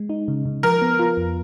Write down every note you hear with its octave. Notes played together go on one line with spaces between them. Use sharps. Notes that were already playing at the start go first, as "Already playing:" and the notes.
Already playing: G#3
D#4
C#3
C#3
F3 A#4
B3
F4
F2